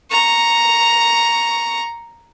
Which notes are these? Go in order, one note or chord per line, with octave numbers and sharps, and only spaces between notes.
A#5 C#6